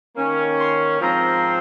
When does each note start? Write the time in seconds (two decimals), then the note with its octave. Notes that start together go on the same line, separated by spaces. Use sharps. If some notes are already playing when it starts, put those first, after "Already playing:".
0.16 D#3 A#3 C#4
0.59 C6
1.01 G#2 F3 C4 A#5